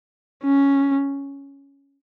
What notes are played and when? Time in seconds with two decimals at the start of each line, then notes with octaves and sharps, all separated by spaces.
0.44 C#4